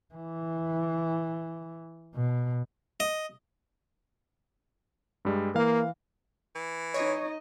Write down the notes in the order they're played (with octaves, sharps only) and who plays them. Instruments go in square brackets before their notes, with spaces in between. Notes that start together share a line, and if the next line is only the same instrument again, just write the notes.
[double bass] E3
B2
[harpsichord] D#5
[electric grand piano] G2 G3 G#3
[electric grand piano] E3 F5 [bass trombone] A#3
[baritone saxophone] E3
[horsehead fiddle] D#4 D#5 [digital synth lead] C#5